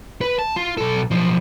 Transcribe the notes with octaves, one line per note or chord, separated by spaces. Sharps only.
B4
A5
F4
B1 A4
B1 F3